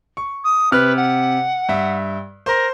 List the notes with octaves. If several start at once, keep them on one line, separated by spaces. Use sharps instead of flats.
C#6
D#6
C3 B4 F6 F#6
F#5
G2 E5
A#4 C5 C6